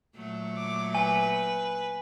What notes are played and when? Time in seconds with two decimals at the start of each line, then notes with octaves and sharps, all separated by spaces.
0.16 A#2 F#3 A3
0.57 D6
0.95 B4 G#5